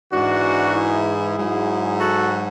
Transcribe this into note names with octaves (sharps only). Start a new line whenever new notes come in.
G#2 E3 D4 F#4
E4 G#4
G#2 F#3
F#4 A4